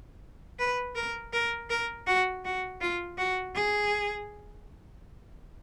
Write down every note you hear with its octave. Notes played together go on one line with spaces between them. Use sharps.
B4
A#4
A#4
A#4
F#4
F#4
F4
F#4
G#4